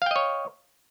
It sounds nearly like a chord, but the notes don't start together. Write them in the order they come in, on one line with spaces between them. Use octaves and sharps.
F5 G5 D#5 C#5